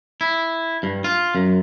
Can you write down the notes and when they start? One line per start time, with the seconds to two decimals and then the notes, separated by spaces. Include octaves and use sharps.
0.21 E4
0.83 G2
1.04 F4
1.35 F#2